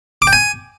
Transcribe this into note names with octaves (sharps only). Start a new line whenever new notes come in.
D6
G5
G#5